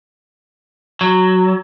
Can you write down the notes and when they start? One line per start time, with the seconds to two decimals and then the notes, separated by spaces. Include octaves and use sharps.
1.01 F#3